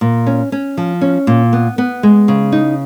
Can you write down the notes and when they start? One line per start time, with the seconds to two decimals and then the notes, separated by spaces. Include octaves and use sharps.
0.01 A#2
0.26 C#4
0.52 C#4
0.77 F3
1.01 C#4
1.27 A#2
1.53 B3
1.78 B3
2.03 G#3
2.28 C#3
2.52 D#4